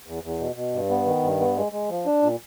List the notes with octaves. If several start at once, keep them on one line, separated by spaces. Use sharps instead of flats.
E2
E2
B2
B2
G2
B3
D#3
G2
B3
G#3
G#3
F3
D4
A#2